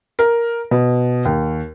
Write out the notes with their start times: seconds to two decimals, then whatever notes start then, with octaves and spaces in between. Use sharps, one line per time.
0.19 A#4
0.71 B2
1.25 D#2